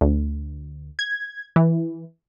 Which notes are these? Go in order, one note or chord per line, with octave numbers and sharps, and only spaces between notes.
D2
G#6
E3